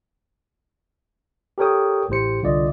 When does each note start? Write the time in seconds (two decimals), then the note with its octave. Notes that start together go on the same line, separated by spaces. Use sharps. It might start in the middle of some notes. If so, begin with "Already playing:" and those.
1.58 G4 A4 A#4 C#5 G5 D#6
2.09 A1 A2 G4 C5 C#7
2.42 C2 D3 F4 D5 D#5